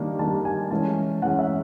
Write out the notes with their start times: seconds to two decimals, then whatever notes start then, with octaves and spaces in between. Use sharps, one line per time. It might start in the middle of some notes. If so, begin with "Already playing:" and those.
Already playing: D#3 G3 A#3 D4
0.19 D#3 G3 A#3 D4 A5
0.45 G#5
0.71 E3 G#3 C#4 A5
1.22 E3 G#3 C#4 F#5
1.39 E5